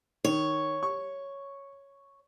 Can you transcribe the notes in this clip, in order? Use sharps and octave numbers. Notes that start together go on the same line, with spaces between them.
D#3 C#5
C#6